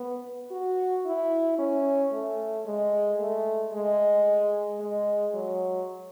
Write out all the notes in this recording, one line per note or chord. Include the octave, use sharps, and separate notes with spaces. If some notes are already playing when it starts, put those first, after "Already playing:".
Already playing: B3
F#4
E4
C#4
A3
G#3
A3
G#3
G#3
F#3